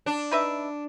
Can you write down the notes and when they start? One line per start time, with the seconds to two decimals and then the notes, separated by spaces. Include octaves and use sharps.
0.06 D4
0.31 D#4 B4 E5